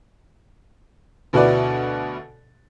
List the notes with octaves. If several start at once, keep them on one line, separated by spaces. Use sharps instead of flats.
D2 B2 E4 F#4 B4 D5